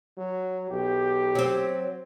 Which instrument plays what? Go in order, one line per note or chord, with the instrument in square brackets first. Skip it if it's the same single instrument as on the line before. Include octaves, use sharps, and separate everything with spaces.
[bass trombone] F#3
[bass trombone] B1 [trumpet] G4
[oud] F#3 C4